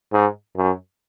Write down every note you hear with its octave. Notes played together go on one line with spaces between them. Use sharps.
G#2
F#2